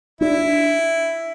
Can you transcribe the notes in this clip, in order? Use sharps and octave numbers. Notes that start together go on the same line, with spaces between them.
D4 E4